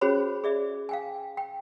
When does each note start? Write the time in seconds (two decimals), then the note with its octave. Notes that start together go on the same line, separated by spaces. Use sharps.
0.01 C#4 F#4 G#4 C5 C#5 B5
0.44 G#4 D5 E5
0.89 F5 G5 G#5
1.37 G5